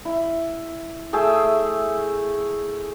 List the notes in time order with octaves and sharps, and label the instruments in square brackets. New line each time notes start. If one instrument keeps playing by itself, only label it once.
[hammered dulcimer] E4
A3 G#4 E5 G5